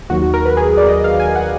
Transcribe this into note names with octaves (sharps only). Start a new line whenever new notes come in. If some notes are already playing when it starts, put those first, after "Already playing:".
D#2 D#3 F#3 F#4
F#4
A#4
B4
G#4
D5
D#5
F5
G#5
F#5